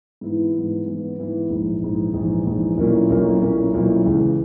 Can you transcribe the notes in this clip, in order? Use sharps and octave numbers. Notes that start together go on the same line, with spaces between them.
G#2 E3 B3 E4
G#2 E3 B3 E4
G#2 E3 B3 E4
G#2 E3 B3 E4
A#1 G#2 E3
A#1 G#2 E3
A#1 G#2 E3
A#1 G#2 E3
B1 A#2 A#3 C#4 E4
B1 A#2 A#3 C#4 E4
B1 A#2 A#3 C#4 E4
B1 A#2 A#3 C#4 E4
C#2 C#3 E3